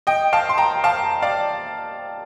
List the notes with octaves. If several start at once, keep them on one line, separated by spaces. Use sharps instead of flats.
D#5 G5
F5 A5
C6
G5 A#5
F5 A5
D5 F5